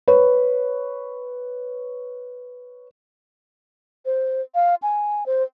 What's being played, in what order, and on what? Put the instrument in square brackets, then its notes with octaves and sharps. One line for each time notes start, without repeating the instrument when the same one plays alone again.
[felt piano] B4 C#5
[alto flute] C5
F5
G#5
C5